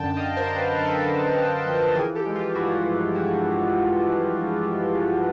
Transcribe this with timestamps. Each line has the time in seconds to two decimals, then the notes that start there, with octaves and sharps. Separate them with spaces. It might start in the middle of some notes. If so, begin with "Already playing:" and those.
Already playing: F#2 D3 G5 A5
0.17 F#2 D#5 F5
0.37 A#4 C5
0.46 D3
0.56 B4
0.71 A#4
0.76 F#2
0.84 A4 B4
1.06 D3
1.36 F#2
1.66 F3
1.95 E3 G#4 A#4
2.15 G4 A4
2.26 G#3
2.35 F4 G4
2.55 G2 E4 F#4
2.85 G2
3.14 E3 E4 F#4